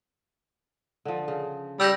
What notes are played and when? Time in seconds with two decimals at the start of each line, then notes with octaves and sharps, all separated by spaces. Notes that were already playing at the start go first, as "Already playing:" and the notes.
1.05 D3 F3
1.28 C#3
1.80 G3 G4 E6 G6 A#6